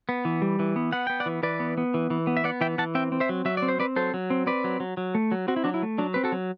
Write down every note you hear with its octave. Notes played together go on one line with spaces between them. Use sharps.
B3
E3
G3
E3
B3
B3 F#5
B3 G5
D5 F#5
E3
E3 B4 D5
B3
B3
E3
E3
B3
E5
B3 D5 F#5
E3 E5 G5
E3 F#5 A5
C4 E5 G5
C4
C5 E5
F#3
F#3 E5
D5
C4
C5
C4 B4 D5
F#3 A4 C5
F#3
C4
C4 B4 D5
F#3
F#3
F#3
A3
F#3
C4 F#4
E4
F#3 D4 F#4
E4
A3
F#3 D4
C4 B4
F#4 A4
F#3